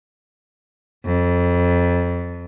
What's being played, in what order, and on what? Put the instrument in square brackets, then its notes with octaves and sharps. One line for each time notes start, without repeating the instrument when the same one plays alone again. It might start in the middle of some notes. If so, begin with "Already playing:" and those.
[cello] F2